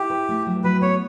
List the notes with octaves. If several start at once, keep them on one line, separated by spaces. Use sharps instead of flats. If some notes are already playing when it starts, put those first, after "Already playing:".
Already playing: E4 G4
B4
A3
F#3
F#3 B4
B3 C#5